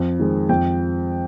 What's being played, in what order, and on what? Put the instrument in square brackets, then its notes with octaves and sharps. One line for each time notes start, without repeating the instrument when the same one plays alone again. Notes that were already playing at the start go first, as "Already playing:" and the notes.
Already playing: [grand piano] F2
D#3 G#3 C4
F2 G5